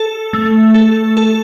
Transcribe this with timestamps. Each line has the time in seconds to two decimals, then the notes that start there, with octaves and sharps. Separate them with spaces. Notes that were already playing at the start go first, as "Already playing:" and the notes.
Already playing: A4
0.33 A3
0.74 A4
1.17 A4